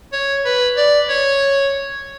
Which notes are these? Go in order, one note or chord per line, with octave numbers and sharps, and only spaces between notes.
C#5
B4
D5
C#5